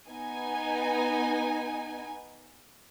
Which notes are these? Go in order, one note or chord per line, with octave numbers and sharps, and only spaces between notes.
B3 D#4 G#5